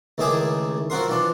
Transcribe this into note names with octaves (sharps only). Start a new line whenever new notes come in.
C#2 D#3 A3 E4 G#4 D6
F3 C4 F#4 A#4 C6
E3 F3 D4